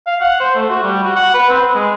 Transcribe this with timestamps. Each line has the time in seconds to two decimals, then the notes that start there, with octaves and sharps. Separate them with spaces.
0.07 F5
0.21 F#5
0.40 C5
0.55 A3
0.70 F#4
0.83 G3
1.04 F#4
1.16 F#5
1.34 B4
1.50 C4
1.62 B4
1.74 G#3